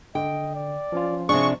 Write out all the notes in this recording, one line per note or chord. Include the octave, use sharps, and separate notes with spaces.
D3 D#5 G5
D5
F3 C#4 F4
C3 D4 G#4 C#6